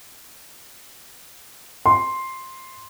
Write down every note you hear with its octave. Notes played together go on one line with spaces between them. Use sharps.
C6